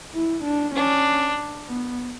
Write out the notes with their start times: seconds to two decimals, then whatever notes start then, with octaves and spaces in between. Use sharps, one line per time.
0.14 E4
0.44 D4
0.75 C#4 D4
1.67 B3